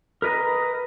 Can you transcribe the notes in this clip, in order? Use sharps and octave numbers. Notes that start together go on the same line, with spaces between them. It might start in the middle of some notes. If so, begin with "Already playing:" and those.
A#4 B4 D#5 A#5